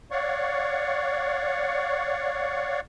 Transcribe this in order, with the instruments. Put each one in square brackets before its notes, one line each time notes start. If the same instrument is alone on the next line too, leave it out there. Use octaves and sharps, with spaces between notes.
[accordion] C#5 D5 F5 F#5 C#6